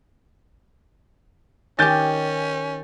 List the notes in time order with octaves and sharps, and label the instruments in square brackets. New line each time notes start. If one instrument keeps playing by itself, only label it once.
[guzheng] D#3 G4 [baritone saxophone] C#4 [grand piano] G#5 G6 A6